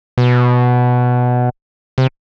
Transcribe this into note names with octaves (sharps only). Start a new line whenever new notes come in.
B2
C3